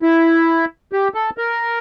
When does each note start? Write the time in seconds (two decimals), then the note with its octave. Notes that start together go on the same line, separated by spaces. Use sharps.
0.02 E4
0.92 G4
1.14 A4
1.38 A#4